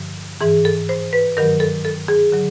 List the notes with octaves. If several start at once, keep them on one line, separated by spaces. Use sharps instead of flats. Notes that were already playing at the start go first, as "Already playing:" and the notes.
Already playing: G2 D3 F3
G#2 E3 G#4
A4
C5
B4
G2 D#3 F#3 A#4
A4
A4
G#4
D3 F#3